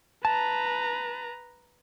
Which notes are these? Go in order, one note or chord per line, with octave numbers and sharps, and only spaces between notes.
B4 A5 A#5